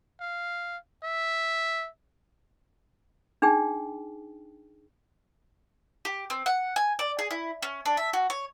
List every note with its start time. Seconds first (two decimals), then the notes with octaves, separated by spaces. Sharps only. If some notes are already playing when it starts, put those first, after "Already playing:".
0.20 F5
1.03 E5
3.42 D4 D#4 G#4 G5
6.05 G4
6.30 C4
6.46 F#5
6.76 G#5
6.99 D5
7.19 G#4
7.31 E4
7.62 C#4
7.86 D4
7.97 E5
8.13 F#4
8.30 C#5